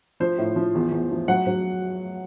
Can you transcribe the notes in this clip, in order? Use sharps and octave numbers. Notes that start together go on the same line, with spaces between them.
F3 C5
A2
F3
E2
E2
F3
F#3 F#5
F#3